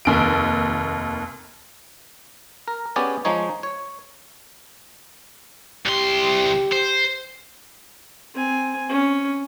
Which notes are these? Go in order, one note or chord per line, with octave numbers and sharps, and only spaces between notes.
F1 D#2 D7
A#4
B3 C#4 G4 G#4 D5
F3 G#3 D#4 C#5
C#5
C2 G4 C6
C5
C4 G#5
C#4